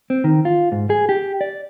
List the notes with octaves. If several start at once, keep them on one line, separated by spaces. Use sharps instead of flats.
C4
D#3
F4
G#2
G#4
G4
D5